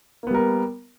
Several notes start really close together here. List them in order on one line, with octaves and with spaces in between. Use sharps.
A#3 B3 G3 A#4